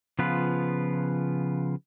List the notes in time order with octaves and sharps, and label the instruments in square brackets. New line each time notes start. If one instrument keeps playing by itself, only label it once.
[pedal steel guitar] C#3 F3 B3 F4 B4